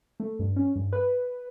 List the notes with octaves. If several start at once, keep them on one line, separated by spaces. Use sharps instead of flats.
A3
G2
C#4
G2
B4